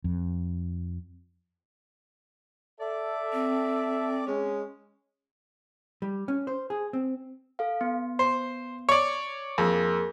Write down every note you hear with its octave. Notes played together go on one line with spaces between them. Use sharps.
F2
A4 D5 E5
C4
G#3 C#4
G3
C#4
C5
G#4
C4
A4 F5
B3
C5
C#5 D5
F2 A#3 G#4 A#4